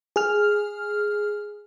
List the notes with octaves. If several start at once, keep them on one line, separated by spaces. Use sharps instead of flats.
G#4 F6